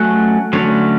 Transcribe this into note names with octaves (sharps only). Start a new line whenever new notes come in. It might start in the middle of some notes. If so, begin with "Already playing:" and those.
Already playing: F#3 A3 C#4 F#5
D3 F#3 A3 C#4